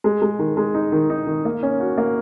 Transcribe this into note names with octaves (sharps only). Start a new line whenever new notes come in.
G#3
G#3
D#3
G#3
D#4
D#3
D#4
D#3
A#3
C#4
F#4
A#3